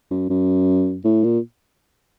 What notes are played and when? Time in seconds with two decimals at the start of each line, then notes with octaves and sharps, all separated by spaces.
0.11 F#2
0.30 F#2
1.04 A2
1.24 A#2